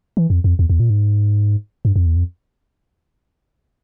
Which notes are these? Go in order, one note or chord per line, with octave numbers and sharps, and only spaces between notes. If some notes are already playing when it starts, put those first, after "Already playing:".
E3
F2
F2
E2
E2
A#2
G#2
G2
F2
E2
F2